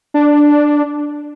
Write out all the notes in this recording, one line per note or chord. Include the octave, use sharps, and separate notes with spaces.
D4